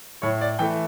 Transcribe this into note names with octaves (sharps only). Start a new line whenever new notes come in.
A2 C#5
D5
E3 A3 G5